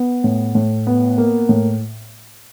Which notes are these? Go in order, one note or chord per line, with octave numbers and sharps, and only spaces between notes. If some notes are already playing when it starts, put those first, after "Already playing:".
Already playing: B3
A2
A2
B3
A#3
A2